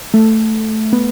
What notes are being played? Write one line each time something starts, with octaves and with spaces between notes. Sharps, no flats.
A3
B3